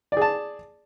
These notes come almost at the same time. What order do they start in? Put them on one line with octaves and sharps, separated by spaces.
D5 G#4 A5